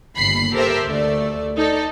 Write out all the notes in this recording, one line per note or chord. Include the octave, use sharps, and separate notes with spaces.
G1 D#2 B5 C7
G4 A4 A#4 C5 E5
D2 A3 D5
D#4 A4 D5